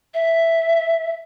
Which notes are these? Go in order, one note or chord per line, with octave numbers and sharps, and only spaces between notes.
E5